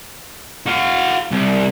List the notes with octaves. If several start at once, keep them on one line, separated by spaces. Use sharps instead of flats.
F#4 F5
C2